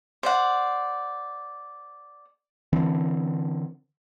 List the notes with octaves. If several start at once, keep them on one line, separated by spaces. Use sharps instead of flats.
C5 D5 F#5
D3 E3 C4 D4